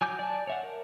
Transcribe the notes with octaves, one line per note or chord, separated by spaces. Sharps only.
F#3 G#5 D6 G6
D5 G#5 A5
C#5 E5 F#5
A#4